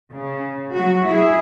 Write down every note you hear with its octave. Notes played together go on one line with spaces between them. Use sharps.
C#3
F#3 F#4
E4 G#4